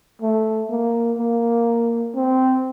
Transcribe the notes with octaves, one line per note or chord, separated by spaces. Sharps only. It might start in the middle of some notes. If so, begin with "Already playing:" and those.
A3
A#3
A#3
C4